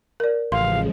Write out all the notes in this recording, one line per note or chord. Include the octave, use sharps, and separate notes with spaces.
A#4 D5
A1 C#3 F3 G#3 F5 C6